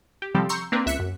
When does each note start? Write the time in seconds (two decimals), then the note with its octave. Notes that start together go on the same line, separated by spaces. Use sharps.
0.22 G4
0.35 C3 F3 G3 C4 G4 A4
0.49 A#5 C6 C#6 E6 G6 C#7
0.72 A#3 C4 D4 A#4 B4
0.86 C#2 E5 F#6 B6 C#7
0.99 F#2